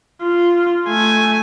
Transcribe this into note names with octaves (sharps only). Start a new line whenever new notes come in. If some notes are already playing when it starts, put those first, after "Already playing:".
F4
A3 G#5